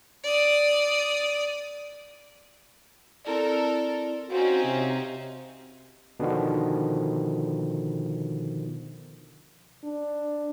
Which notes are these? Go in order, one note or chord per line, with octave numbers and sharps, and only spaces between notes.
D5 D#6
C4 E4 A4 A#4 D5
C4 C#4 D#4 F#4 F5
C3
B2 D3 D#3 F3
D4